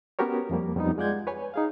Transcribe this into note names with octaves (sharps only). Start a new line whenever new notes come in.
B3 C#4 F#4 G4 A#4 C#5
F2 F3 G3 A#3
F2 G3 B3 D#4
G#3 F4 D5 F#5 G6 G#6
B4 C#5 G#5
D#4 G#4 F5